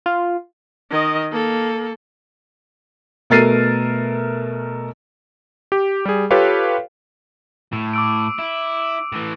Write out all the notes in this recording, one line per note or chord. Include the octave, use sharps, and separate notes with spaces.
F4
D#3 D#5
A#3 A4
B2 A3 A#4 A6 C7 D#7
G4
G3 G#4
F4 G4 A4 B4 C#5 F5
A2
D6 E6 D7
E4
A2 E3